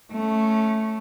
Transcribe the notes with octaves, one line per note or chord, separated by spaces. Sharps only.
A3 C#4